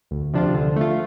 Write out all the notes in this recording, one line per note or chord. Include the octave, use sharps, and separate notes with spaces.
D2
C3 F3 D4 F4
D3
A3 F4